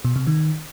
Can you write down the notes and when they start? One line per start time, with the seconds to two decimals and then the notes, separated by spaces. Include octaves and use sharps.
0.05 B2
0.16 C3
0.27 D#3